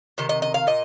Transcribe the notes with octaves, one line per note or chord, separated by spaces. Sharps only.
C3 D#3 D#5
D#5
D#5
F5
A#2 D#5